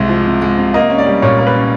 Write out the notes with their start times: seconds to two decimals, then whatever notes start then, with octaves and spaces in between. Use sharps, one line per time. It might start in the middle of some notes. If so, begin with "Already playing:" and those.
Already playing: C2 C3 G#3 E5
0.09 F3
0.26 C3
0.42 G#3
0.58 C3
0.74 A#3 D#5
0.90 C#4
0.98 D5
1.06 G3
1.22 A#2 C#5
1.38 A#3
1.46 B4
1.54 C#4